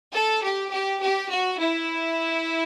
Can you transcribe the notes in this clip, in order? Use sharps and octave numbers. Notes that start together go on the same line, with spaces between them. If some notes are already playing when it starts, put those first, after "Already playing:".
A4
G4
G4
G4
F#4
E4